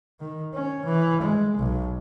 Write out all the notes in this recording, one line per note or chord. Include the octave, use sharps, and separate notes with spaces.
D#3
C#4
E3
G#3
B1